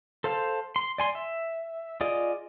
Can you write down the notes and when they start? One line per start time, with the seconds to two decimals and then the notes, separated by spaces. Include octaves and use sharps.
0.24 A4 C5 F5 A5
0.76 C6
0.98 D5 G#5 C6
1.15 E5
2.01 F4 G#4 D5 D#5